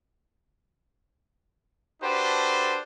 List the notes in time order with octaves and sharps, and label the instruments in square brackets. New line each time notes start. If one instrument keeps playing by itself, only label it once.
[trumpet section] D4 F#4 G4 A4 B4 C5